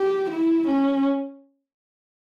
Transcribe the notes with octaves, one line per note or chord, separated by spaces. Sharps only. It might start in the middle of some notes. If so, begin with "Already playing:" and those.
Already playing: G4
E4
C#4